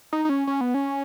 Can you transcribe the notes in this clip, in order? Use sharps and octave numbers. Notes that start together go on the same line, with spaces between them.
D#4
D#4
C#4
C#4
B3
C#4